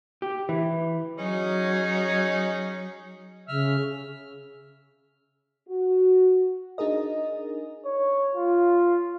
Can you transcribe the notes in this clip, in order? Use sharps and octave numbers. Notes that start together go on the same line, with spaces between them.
G4
E3
F#3 C#4 D#4 G#4
C#3 E5 F6
F#4
D4 D#4 G#4 A#4 D#5
C#5
F4